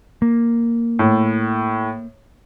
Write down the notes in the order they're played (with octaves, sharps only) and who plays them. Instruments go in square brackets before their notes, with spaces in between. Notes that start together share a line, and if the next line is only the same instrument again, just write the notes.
[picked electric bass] A#3
[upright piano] A2